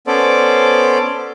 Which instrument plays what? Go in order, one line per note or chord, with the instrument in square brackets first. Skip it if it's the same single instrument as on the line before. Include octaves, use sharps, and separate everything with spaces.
[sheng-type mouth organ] B3 C#4 A4 C5 D5